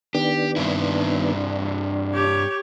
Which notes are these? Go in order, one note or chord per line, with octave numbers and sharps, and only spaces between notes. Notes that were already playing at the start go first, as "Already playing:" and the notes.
D#3 B3 D4 G4
G2 C4 E4
D4
G4 C#5